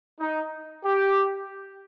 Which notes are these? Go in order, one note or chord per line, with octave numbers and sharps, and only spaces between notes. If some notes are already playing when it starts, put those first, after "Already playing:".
D#4
G4